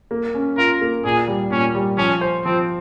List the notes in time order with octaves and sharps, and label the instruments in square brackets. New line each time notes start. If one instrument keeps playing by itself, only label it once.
[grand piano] A#3
C#4
[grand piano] F4 [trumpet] A#4
[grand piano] A#3
[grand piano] A#2 [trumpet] G#4
[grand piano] G3
[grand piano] A#2 [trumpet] C#4
[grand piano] G3
[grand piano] F3 [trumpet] C#4
[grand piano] C5
[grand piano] F3 [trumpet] C4